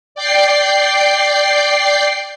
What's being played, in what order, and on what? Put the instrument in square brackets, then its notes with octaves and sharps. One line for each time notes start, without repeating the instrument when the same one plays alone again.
[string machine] D5 G5 C7